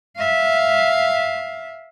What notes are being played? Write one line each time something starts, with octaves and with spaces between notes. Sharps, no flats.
E5 F5